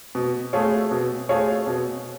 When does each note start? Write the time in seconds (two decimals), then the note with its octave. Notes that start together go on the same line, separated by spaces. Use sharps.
0.15 B2
0.53 A3 F4 G#4 C#5
0.91 B2
1.29 A3 F4 G#4 C#5
1.67 B2